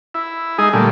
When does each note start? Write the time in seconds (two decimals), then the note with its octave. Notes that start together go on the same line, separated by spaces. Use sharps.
0.14 E4
0.58 G#3 D#4 G#4
0.73 A#2 D3 G3 A3